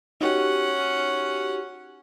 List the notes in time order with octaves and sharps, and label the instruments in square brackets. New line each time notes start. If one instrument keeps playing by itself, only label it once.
[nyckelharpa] C#4 F#5 [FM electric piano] D#4 F#4 G4